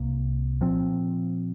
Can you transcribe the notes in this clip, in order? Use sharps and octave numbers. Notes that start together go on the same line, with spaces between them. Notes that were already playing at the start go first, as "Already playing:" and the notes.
Already playing: C2 C3 A#3
A#2 F3 C4